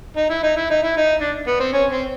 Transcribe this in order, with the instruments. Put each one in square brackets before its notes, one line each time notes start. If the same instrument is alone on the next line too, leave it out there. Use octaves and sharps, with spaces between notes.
[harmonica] D#4
E4
D#4
E4
D#4
E4
D#4
D4
B3
C4
C#4
C4